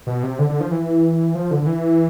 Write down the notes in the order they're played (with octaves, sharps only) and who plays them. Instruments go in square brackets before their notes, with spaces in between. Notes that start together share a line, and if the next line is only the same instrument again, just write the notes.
[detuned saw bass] B2
C3
D3
D3
F3
E3
F3
D3
D3
E3